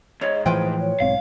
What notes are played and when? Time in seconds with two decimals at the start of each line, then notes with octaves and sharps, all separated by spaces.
0.21 D2 G#2 C#5 D#5
0.46 A2 E3 F3 F4 B4 C5 G5
0.80 C#5
1.00 B1 G#2 C4 F5